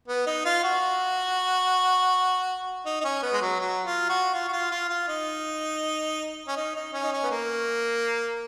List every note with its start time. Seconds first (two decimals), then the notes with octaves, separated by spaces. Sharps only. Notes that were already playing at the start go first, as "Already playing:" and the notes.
0.08 B3
0.27 D#4
0.45 F4
0.64 F#4
2.86 D#4
3.01 D#4
3.04 C#4
3.22 B3
3.33 G#3
3.41 F#3
3.60 F#3
3.85 F4
4.09 F#4
4.34 F4
4.48 F#4
4.53 F4
4.72 F4
4.89 F4
5.08 D#4
6.47 C#4
6.56 D#4
6.75 D#4
6.93 C#4
7.03 D#4
7.12 C#4
7.23 B3
7.30 A#3